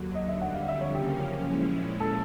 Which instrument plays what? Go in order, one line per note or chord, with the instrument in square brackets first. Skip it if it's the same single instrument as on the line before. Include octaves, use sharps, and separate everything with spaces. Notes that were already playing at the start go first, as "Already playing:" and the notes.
Already playing: [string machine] D#2 D3 F#3
[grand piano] D#5
E5
[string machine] F2 D3 G3 [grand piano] F#5
[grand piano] F5
E5
C#5
[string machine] F#2 C#3 F3 A#3 C#4 [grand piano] G4
[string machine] A#2 F3 G#3 C#4 E4
[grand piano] A4